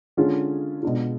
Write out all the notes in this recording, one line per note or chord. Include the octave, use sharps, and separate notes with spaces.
D3 G#3 C#4 F4 G#4
B2 G#3 D4 F4